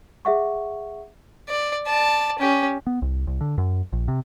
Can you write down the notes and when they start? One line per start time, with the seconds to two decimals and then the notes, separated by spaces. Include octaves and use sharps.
0.25 G#4 E5 F#5 C#6
1.49 D5
1.87 D5 A5
2.39 C#4 G4
2.87 B3
3.02 C2
3.27 C2
3.41 D3
3.58 F#2
3.93 A#1
4.08 C3